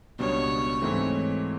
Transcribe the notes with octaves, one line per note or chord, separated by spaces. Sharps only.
C#2 B2 G3 B3 D4 C#5
G#2 E3 A3 C4